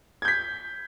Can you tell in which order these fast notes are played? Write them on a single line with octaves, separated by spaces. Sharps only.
G#6 G6 B6